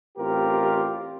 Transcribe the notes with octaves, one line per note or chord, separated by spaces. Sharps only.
A1 C4 F4 G4 A#4